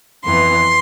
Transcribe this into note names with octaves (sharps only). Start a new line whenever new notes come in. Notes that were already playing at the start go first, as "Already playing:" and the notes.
F2 E3 B3 C6